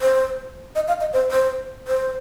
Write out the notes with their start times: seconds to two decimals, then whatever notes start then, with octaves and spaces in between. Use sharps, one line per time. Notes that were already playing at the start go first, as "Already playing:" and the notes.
0.01 C5
0.75 D#5
0.88 F5
1.01 D#5
1.13 C5
1.31 C5
1.88 C5